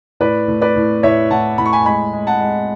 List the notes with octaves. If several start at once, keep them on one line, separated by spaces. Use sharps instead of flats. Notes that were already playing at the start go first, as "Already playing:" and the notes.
A2 B4 D5
A2
B4 D5
A2
A2 C#5 E5
A2 F#5 A5
A2 B5
C#6
G#5 B5
G#3 G#5 B5
G#3
F#5 A5
G#3